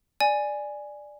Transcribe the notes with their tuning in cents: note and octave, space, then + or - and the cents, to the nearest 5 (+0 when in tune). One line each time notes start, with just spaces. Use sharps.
D5 +10 G#5 +0